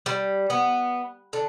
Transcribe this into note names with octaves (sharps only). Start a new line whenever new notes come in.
G3
B3
D3